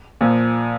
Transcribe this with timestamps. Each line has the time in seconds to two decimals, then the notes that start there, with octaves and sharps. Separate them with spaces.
0.21 A#2 F3